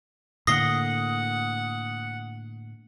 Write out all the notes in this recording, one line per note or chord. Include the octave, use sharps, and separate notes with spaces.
A2 D3 A#3 F#5 D#6 A#6 C7 G7